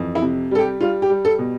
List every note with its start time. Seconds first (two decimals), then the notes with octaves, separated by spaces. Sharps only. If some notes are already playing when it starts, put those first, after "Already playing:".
Already playing: F2 E3
0.15 E4
0.22 C3
0.51 G3 A4
0.59 G4
0.81 G3 F4
1.02 G4
1.10 G3
1.25 A4
1.39 B2